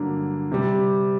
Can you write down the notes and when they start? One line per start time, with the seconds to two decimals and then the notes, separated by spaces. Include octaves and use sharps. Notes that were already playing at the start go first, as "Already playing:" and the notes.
Already playing: G2 D3 F#3 A#3
0.52 C3 G3